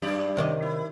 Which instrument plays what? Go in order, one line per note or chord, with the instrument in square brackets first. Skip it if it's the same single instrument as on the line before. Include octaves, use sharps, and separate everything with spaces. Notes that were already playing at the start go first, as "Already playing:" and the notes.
[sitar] F#2 G4 D5
[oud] C3 D#3 D#5
[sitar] E4